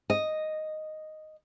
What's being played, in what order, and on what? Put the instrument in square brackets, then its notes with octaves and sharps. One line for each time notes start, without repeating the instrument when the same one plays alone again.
[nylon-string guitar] D#5